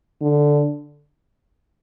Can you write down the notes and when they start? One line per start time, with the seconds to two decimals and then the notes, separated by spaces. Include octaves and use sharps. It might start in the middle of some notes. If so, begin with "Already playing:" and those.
0.21 D3